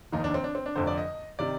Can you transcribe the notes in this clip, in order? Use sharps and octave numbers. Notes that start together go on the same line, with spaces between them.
F1 D#2 D#3 D#4
D4
C4
D4
C4
D4
F1 F2 D3 C5
D5
D#5
C3 D#3 D5